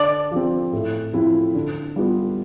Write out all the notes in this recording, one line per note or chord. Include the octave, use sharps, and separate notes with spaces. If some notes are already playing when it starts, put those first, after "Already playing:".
Already playing: D3 D5
F3 C4
A2
F3 C4 E4
D3
G3 B3 F4